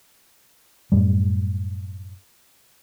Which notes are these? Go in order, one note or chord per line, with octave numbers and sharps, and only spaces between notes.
F#2 A2 G3